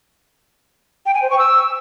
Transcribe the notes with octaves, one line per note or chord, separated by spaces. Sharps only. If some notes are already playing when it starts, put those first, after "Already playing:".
G5
G#5
C5
C#6
E6